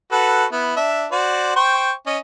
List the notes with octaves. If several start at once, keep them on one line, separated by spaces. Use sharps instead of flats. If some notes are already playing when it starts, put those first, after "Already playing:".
F#4 A4 B4
B3 E4
D4 E5
F#4 C5 D5
C5 G5 C#6
C#4 D#5